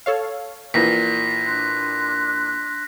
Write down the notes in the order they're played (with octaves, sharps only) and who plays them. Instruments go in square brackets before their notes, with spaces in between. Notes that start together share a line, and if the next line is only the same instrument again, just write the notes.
[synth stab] A4 C#5 F5
[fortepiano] A#1 A#2 E3 [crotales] A#6 B6
[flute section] D4 C6 F#6